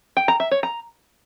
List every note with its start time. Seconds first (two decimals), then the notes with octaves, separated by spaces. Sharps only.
0.17 G5
0.28 A#5
0.40 E5
0.51 C#5
0.63 A#5